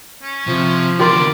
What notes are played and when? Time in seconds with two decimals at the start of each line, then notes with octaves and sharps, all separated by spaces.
0.22 C#4
0.47 C3 F3
0.99 E2 D3 G4 A#4 D5 C6